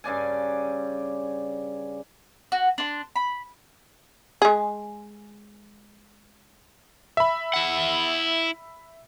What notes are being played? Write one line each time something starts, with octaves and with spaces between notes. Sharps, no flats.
G2 C#3 D5 G#5
F#4
D4 C6
B5
G#3 G#4
E5 B5
E4 F#5